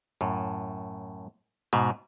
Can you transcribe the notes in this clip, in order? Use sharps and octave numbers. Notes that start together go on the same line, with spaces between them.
F#2 A2
G#2 B2